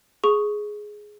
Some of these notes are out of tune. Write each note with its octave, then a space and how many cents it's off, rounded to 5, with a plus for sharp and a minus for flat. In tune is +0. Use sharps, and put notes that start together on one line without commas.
G#4 +10 C#6 +0